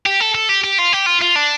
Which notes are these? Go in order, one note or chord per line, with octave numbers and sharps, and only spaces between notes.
G4
A4
A4
G4
G4
F4
G4
F4
F4
D4